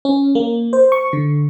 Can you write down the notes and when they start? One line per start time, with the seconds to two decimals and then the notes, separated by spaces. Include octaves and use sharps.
0.05 C#4
0.35 A#3
0.73 C5
0.92 C#6
1.13 D3